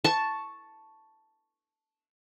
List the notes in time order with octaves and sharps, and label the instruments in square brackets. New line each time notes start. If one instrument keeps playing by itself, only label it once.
[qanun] A5 C#6